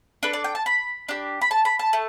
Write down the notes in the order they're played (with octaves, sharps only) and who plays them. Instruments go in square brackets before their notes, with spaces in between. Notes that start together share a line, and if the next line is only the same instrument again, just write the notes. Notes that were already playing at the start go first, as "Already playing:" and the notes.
[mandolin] D4 A4 B4
D5
G5
A5
B5
D4 G4
B5
A5
B5
A5
A3